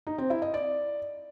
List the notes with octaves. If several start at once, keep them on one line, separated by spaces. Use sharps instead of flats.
D#4
C4
E4
D#5
D5